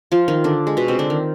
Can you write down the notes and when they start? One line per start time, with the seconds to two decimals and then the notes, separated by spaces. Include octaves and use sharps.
0.12 F3 F4
0.28 D#3 D#4
0.44 D3 D4
0.67 G#3
0.77 B2 B3
0.88 C3 C4
0.99 D3 D4
1.10 D#3